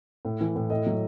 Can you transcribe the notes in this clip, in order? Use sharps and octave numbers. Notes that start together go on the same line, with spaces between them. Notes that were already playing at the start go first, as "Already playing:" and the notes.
A2
E3
A2
A2 D#5
F#3